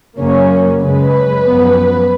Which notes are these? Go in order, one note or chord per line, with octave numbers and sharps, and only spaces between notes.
F#2 C#3 F#3 A#3 C#4
F#2 C#3 G#3 B4
F#2 F3 B3